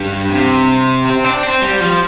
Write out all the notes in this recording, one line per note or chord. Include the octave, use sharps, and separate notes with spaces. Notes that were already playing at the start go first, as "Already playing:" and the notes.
Already playing: G2
C3
C4
D4
C4
G3
F3